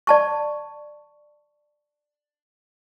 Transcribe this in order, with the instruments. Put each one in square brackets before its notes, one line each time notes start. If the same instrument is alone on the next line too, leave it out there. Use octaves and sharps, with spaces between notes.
[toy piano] D5 A5 C#6